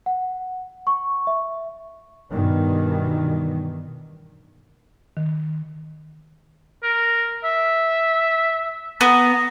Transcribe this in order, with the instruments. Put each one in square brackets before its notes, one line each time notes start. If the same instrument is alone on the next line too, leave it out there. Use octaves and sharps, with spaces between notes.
[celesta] F#5
C#6
E5
[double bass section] G2 B2 D#3 E3
[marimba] D#3
[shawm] A#4
E5
[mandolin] B3 [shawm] A#5